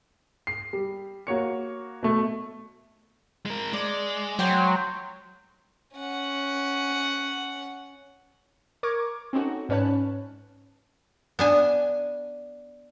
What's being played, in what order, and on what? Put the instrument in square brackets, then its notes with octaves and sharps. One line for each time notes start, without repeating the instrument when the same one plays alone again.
[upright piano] C7
G3
A#3 F#4 C#5 C#7
B2 A3
[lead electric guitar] G#3 A#4
[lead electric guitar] G#3 [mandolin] D5
[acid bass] F#3 [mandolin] C5 G5 C6
[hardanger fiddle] C#4 F#5
[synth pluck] A#4 C#6 D6 G#6
C4 C#4 D#4 F#4 A4
G#2 C#4 B4 C#5 A5 F#6
[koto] B3 D4 G#5